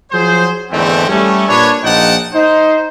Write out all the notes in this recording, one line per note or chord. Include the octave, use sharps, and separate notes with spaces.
F3 F#3 G#4 C5
E2 G#2 D3 A3 B3 C4
G3 A3 C#4
A#2 D4 B4 C#5
A#1 D#4 F4 F#5 G5 A5
D#4 C5